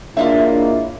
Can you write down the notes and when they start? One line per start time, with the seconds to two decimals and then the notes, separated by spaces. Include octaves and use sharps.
0.17 A#3 D4 E4 F4 G#4 C#5 D#5 E5